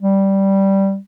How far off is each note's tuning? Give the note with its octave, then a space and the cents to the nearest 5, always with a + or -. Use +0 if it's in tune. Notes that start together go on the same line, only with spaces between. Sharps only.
G3 -10